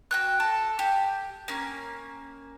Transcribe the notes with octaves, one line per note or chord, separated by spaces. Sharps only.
F#4 G5 F#6
A4
G4
A#3 C#4